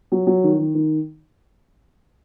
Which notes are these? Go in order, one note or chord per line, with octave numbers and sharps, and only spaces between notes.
F#3
F#3
D#3
D#3
D#3